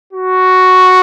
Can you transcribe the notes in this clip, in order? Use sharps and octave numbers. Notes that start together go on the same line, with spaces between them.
F#4